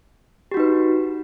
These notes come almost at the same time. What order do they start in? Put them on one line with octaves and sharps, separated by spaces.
G4 F#4 D#4 B4